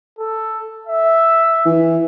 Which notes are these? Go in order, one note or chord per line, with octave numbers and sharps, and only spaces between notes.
A4
E5
E3